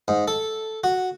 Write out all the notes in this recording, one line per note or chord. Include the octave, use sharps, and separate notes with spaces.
G#2
A4
F#4